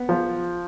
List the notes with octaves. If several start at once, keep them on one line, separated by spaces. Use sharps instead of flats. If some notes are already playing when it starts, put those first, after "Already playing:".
Already playing: B3
F3